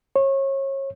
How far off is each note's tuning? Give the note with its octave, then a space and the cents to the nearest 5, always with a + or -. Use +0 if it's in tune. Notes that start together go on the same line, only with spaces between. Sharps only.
C#5 -30